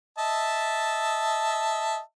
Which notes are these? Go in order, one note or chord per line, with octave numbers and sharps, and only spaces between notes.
D#5 E5 A5